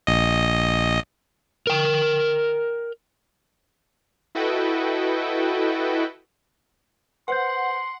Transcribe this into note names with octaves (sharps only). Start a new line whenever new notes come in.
A#1 D#5
A#4 G5
E4 F#4 A4 B4 D#5 G5
B4 C5 F#5 C6 G6